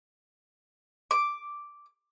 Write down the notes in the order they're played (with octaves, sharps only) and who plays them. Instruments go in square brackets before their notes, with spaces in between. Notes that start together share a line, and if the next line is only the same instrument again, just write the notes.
[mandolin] D6